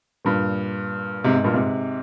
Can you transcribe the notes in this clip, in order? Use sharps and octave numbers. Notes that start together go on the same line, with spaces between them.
G2 A#2
G#2 C3
G#2
G2 A#2
G#2 C3